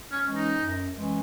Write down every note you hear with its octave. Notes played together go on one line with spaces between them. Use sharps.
C#4
E3 G#3 C#4
D#4
F#2
E3 G#3 C#4